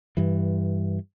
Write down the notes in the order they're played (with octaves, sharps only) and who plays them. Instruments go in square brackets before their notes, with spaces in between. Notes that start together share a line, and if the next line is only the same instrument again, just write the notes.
[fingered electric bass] G2 E3